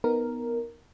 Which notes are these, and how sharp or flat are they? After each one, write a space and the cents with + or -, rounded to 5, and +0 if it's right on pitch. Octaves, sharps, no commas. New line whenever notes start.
B3 +0 D#4 +0 A#4 +0